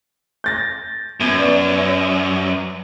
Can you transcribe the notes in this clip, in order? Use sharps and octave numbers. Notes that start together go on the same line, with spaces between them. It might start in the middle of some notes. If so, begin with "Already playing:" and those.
G6 A6 A#6
F#2 B3 G#6
B4 D5